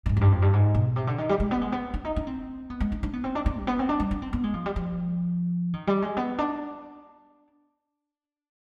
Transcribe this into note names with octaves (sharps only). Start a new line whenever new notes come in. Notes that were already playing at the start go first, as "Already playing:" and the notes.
B2
G#2
F2
G2
F2
G2
G#2
B2
C3
D3
D#3
G3
G#3
B3
G#3
B3
D4
D#4
D4
C4
B3
G#3
D4
D4
B3
C4
D4
D4
G3
B3
C4
D4
G3
D4
C4
B3
G#3
F3
G3
F3
D#3
G3
G#3
B3
D4